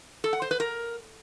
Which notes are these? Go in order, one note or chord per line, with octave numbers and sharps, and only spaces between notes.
A4
F#5
C5
B4
A#4